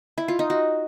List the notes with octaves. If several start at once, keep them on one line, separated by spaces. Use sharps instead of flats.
E4
F4
D#4
F#4